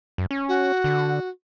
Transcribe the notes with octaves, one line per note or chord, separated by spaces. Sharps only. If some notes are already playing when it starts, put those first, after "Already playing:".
F#2
C#4
F#4
D3